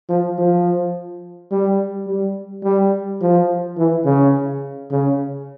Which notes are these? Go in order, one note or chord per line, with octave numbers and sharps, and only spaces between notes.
F3
F3
G3
G3
G3
F3
E3
C#3
C#3